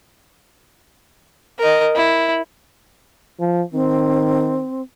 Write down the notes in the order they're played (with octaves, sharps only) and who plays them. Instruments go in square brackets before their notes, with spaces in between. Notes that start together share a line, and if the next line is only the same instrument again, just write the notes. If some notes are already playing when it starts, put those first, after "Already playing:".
[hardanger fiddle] A#4 D#5
E4
[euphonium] F3
[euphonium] D#3 [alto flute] C4